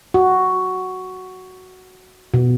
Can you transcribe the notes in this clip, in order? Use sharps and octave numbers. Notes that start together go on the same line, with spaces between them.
F#4
B2